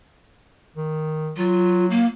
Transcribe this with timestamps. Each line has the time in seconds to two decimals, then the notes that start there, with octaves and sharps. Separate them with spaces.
0.76 D#3
1.37 F#3 F4
1.90 A#3